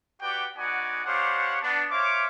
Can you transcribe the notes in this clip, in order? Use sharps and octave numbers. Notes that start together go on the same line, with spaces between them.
F#4 G4 B4 D5 F#5 G5
B3 D#4 F#4 D5 F#5 G#5
D4 G4 C5 C#5 F5 F#5
B3 D4
C5 C#5 E5 F5 D6